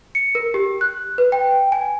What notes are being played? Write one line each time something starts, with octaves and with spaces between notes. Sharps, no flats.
C#7
A#4
G4
F#6
B4
G5
G#5